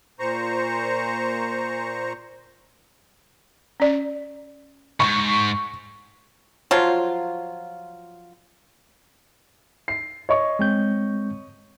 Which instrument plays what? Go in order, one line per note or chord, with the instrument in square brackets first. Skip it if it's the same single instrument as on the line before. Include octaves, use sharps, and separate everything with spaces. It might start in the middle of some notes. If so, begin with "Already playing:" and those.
[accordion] A#2 C5 A#5 C#6
[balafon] C#4 D5
[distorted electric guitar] D#2 G#2 [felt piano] C#6
[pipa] F3 F#3 F4
[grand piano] C7
C#5 D#5 C#6
[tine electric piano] G#3 C4 G6